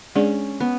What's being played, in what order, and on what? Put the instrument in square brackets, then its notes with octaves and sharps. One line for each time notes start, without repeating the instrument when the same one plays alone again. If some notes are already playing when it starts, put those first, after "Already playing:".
[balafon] G#3 D4 G#4 D5 [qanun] C#4
[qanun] B3